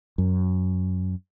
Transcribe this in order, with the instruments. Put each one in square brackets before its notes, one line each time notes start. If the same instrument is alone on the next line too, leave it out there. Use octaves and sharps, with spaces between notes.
[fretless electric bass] F#2